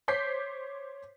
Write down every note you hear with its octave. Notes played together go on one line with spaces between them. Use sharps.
C5 C#5 D6 G6 B6 C7